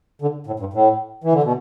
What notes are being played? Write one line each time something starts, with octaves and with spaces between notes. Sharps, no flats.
D3
A2
G2
A2
E3
D3
B2